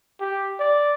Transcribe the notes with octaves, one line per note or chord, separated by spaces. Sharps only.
G4
D5